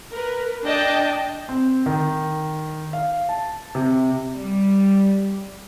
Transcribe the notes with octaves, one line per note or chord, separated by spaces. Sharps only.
A#4 B4
D4 D#5 G5 A5
C4
D#3
F5
A5
C3
G3